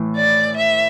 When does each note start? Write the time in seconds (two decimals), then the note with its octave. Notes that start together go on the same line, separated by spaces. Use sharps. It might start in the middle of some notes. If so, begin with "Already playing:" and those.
Already playing: A2 E3
0.16 D5
0.56 E5